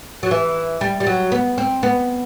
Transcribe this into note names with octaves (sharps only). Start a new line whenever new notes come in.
F#3
E3
G3
G3
F#3
B3
C4
B3